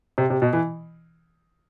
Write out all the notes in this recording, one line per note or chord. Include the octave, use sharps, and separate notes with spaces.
C3
C3
B2
E3